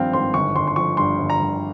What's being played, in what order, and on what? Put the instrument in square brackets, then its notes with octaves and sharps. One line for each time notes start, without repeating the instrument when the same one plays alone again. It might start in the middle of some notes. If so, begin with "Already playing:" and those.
Already playing: [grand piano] G#1 G2 F3 C4 F5 G5
G#1 C6
G1 C#6
G1 C6
C6
F3 C#6
G2 C6
G1
A#5
G1